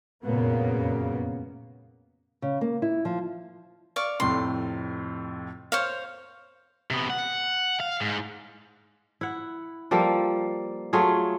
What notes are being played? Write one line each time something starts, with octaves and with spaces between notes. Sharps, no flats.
F1 F#2 A#2 C#3 A#3 B3
C#3
A#3
E4
F3
D5 F5 C#6
F2 A2 C3 C6
C5 C#5 F5
C3 B3
F#5
F5
G#2
E4 F#5
F3 G3 A#3 A4
F#3 A3 F4 G#4